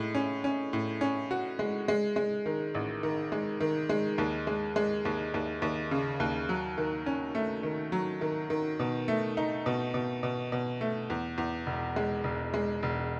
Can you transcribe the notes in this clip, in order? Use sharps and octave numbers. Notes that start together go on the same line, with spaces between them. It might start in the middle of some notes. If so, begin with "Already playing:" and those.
Already playing: A2 G#3
C#4
C#4
A2
C#4
F#4
G#3
G#3
G#3
D#3
A1
D#3
G#3
D#3
G#3
D#2
G#3
G#3
D#2
D#2
D#2
C#3
D#2
F#3
D#3
C#4
A3
D#3
F#3
D#3
D#3
B2
A3
D#4
B2
B2
B2
B2
A3
E2
E2
E1
G#3
E1
G#3
E1